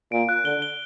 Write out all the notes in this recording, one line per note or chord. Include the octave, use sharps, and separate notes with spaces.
A#2 D7
F#6
D3 G7
G7